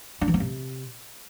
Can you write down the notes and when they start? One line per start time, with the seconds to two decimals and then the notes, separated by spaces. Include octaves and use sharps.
0.21 D4
0.28 E3
0.34 B3
0.40 C3